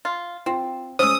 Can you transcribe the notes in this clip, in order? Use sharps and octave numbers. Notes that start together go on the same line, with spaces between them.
F4
C4 F4
G#3 C#4 C5 D#6 E6